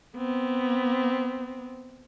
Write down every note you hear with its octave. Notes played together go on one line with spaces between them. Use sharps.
B3 C4